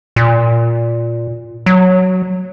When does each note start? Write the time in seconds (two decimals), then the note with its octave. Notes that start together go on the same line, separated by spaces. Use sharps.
0.16 A#2
1.66 F#3